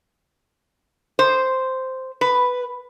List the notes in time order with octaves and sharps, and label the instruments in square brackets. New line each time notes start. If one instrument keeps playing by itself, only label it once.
[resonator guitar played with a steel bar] C5
B4